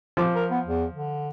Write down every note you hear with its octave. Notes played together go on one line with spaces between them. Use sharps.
F3 D6
A#4
B3
E2
D3